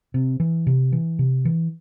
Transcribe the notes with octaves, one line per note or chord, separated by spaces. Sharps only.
C3
E3
C3
E3
C3
E3